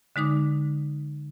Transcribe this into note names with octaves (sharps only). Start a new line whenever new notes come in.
D3 G#3 D#4 D6